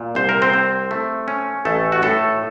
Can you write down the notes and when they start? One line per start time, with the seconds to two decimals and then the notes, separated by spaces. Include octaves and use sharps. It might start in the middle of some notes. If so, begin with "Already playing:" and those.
Already playing: A#2
0.15 C2 C5
0.29 A#4
0.42 C4 C5
0.53 C4
0.91 A3
1.28 C#4
1.65 A1 A3 A4
1.92 F#4
2.02 A2 A3 A4